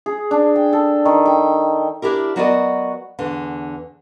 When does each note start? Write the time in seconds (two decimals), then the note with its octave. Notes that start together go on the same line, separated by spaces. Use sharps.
0.06 G#4
0.31 D4
0.56 G5
0.73 A4
1.05 D#3
1.26 G5
2.02 D4 E4 G4 A#4
2.36 F#3 B3 F#4 A#4 D5 D#5
3.19 E2 D3